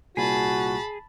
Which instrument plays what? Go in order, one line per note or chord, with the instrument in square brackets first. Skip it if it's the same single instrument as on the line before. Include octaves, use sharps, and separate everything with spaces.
[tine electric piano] C2 A#2 [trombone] F#4 [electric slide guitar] G#4 [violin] A5 B5